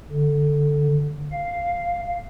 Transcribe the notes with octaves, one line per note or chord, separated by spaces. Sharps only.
D3
F5